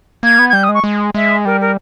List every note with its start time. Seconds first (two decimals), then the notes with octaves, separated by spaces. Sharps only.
0.23 A#3 G#6
0.39 B3
0.49 G#6
0.53 G3 G6
0.63 D#6
0.69 G#3
0.74 C#6
0.84 G#3
1.14 G#3 E5
1.45 G3 A#4
1.60 A#4